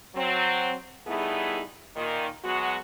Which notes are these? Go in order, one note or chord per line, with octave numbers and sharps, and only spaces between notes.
F#3 C4
G3 A3 B3 D#4 E4 G#4
A#2 D#3
F#3 G#3 B3 F#4